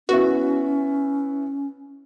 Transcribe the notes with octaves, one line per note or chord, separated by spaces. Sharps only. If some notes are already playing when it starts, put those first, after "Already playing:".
B3 C#4 E4 F#4